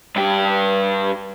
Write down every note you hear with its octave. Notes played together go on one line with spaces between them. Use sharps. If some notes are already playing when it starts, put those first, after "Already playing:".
G2 G4